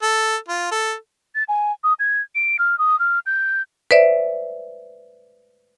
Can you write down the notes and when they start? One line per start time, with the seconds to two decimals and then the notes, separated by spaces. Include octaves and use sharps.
0.02 A4
0.48 F4
0.72 A4
1.35 A6
1.49 G#5
1.84 D#6
2.00 G#6
2.35 D7
2.59 F6
2.79 D#6
3.00 F6
3.26 G6
3.91 B4 C5 D5 E5